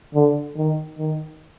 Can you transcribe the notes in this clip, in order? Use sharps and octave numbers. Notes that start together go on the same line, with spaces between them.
D3
D#3
D#3